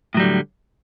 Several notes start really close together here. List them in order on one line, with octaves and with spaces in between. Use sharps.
A2 F#3 G3 D3